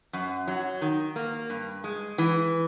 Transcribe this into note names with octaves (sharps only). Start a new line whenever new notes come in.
F#2
F#3
D#3
A#3
G2
G#3
E3